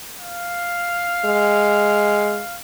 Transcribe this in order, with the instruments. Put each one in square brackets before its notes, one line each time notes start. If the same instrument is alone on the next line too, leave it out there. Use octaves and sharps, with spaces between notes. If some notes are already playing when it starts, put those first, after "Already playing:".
[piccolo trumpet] F5
[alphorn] G#3